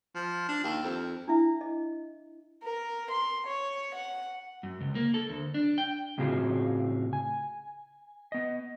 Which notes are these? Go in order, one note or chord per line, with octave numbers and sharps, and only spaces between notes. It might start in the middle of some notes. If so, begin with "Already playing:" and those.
F3
D4
D#2
F2
D4 E4 E5
D#5
A#4
C6
C#5
F#5
F#2
C#2
A#3
A4
D2
D4
G5
A2 C#3 C4 F4 F#4 G#4
G#5
B3 D#5